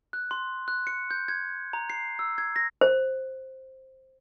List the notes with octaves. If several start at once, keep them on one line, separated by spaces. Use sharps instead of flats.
F#6
C6
F#6
C#7
G6
G#6
A#5
C7
E6
G#6
A#6
C5